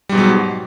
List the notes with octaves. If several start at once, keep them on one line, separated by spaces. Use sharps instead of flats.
G#2 B2 F#3 G3